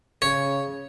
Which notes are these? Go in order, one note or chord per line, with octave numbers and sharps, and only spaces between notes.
C#3 C#5